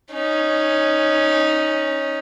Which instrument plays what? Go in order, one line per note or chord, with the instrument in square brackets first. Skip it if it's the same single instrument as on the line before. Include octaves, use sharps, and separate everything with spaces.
[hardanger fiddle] C#4 D#4